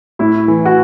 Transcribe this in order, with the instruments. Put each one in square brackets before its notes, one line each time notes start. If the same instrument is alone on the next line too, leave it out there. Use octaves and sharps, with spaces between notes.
[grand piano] A2 [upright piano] E4
[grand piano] E3
[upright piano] F#4